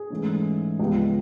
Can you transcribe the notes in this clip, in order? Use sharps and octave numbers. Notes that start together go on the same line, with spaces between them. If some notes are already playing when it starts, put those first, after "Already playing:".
Already playing: G#4
G#2 E3 A3 C#4
C#2 C#3 F3 G#3 B3 G4